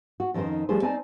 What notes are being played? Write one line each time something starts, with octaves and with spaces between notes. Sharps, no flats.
F#4
F2 D#3 C#4 D#4 C5
F3 G3 A3 G#4 C5
C4 D#4 D5 G#5 A5